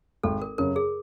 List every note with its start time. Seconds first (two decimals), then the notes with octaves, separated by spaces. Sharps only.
0.23 G#1 A4
0.42 A#4
0.58 F#2 C#3 A#4
0.76 G#4